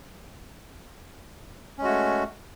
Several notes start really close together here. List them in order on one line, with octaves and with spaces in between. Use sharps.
C#4 G#3 F#4 A3